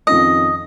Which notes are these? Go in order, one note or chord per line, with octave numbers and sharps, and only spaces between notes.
F2 D#3 C#4 F4 D#5